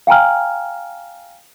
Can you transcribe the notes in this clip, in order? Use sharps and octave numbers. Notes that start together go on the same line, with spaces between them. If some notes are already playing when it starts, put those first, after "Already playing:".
F5 G5 G#5 A#5 F6